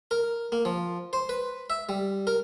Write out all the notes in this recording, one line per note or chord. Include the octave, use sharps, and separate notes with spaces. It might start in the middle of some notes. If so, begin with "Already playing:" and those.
A#4
A#3
F3
C5
B4
E5
G3
A#4